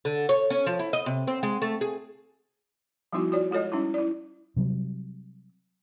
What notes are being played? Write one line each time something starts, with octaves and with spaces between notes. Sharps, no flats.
D3
C#5
C#4
F3
E4
D#5
C3
C4
G#3
A3
G#4
F3 G3 B3 D#4 E4 F#4
F4 F#4 C#5 D5
G#3 F4 A4 C#5 D#5
G3 C#4 D#4 E4
E4 D5
C3 F#3 G3